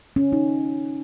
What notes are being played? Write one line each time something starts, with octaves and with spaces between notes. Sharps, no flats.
C#4
D#4